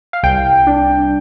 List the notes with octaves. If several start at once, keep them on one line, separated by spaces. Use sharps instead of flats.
F5
C2 G5
D4